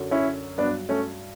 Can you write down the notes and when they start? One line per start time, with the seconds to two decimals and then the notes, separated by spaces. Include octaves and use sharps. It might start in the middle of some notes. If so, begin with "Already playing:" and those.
Already playing: F#2 D3 F#3
0.11 C#4 E4
0.58 G2 F#3 B3 D4
0.89 A3 C#4